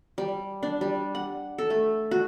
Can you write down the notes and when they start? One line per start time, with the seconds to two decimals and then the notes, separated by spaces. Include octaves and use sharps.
0.18 G3
0.63 D4
0.81 G3
1.15 F#5
1.58 A4
1.70 A3
2.11 F#4